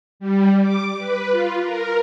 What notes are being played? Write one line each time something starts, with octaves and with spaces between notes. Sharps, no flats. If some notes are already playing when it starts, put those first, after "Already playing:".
G3
D6
B4
F4
A#4